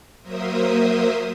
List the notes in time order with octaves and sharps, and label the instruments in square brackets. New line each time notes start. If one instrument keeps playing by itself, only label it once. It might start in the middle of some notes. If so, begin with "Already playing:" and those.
[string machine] F#3 A#3 A#4 C5 E5 D#6